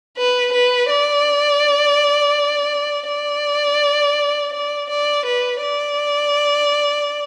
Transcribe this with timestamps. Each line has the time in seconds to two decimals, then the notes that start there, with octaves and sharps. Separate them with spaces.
0.18 B4
0.53 B4
0.90 D5
3.08 D5
4.53 D5
4.90 D5
5.26 B4
5.63 D5